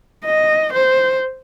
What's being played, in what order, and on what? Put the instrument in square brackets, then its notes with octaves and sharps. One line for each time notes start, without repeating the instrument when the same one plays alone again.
[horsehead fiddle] D#5
C5